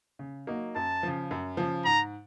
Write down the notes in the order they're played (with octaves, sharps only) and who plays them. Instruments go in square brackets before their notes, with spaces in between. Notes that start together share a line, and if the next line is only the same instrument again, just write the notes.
[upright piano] C#3
F#3 A#3 D#4
[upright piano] F#2 [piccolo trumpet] A5
[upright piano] C#3 F3
F#2
C#3 F3
[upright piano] G#2 [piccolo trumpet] A#5